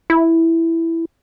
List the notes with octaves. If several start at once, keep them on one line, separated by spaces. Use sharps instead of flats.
E4